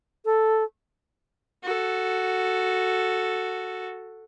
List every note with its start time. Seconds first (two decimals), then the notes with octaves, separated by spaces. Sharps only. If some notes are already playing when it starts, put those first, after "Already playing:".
0.25 A4
1.63 F#4 A4